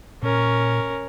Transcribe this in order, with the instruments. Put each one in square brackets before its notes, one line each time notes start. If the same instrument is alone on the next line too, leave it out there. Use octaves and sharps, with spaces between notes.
[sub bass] A#2 [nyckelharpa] C#4 A#4